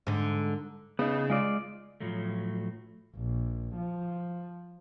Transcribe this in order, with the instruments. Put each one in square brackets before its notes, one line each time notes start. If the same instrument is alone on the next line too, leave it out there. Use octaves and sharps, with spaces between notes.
[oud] G#2 D3
[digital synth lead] C#3 [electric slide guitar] B3 D#4
[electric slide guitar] G#3 F4 D5
A2 F3 F#3 A3
[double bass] A#1
F3